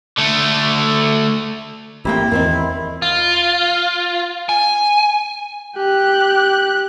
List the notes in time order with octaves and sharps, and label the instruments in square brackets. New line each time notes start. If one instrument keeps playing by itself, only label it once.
[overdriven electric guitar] D3 A3
[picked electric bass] A1 A#3 [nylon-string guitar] C4 G4 G5 [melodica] E4
[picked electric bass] E2 [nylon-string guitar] D#3 C4 A#4
[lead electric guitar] F4
G#5
[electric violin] G4 F#6